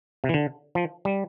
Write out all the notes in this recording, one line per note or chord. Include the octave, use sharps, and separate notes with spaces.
C3
E3
D3
F3
G3